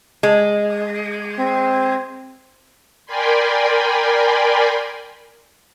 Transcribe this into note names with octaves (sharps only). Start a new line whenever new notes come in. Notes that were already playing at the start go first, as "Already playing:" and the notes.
G#3
C4
A#4 D5 G5 G#5 B5 C6